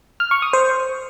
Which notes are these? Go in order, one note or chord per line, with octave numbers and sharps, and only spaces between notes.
F6
C#6
D#6
C5